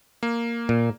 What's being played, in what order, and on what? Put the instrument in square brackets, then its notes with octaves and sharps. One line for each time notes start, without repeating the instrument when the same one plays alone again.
[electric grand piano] A#3
[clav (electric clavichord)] A#2